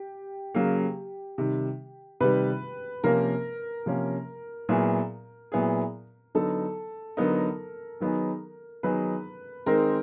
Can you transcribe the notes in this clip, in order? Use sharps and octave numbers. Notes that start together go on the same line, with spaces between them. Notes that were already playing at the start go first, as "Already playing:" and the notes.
Already playing: G4
C#3 F#3 A#3
C3 D#3 G3
C3 D#3 G3 B4
C3 F3 A#3 C#4 A#4
C3 F3 A#3 C#4
A#2 F#3 B3 E4 G#4
A#2 F#3 B3 E4 G#4
D3 F#3 B3 D#4 A4
D3 F#3 B3 D#4 A#4
D#3 F#3 B3 D#4 G#4
D#3 F#3 B3 D#4 G#4 B4
D#3 G#3 C4 D#4 A#4